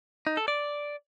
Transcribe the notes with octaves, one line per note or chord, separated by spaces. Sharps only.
D#4
A4
D5